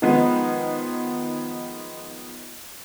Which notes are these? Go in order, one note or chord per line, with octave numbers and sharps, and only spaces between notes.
D#3 F3 G#3 B3 D#4